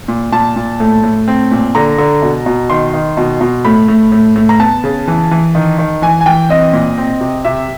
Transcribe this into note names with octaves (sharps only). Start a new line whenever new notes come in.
A#2
A#2 A5
A#2
A2
A2
C4
A#2
D3 A#5
D3
B2
B2
D#3 C6
D#3
B2
B2
A2 B5
A2
A2
A2
A#5
B3 A5
C#3
E3
E3
D#3
D#3
E3 G#5
G#5
E3 G5
C4 D#5
A#2
C4
C3
C3 E5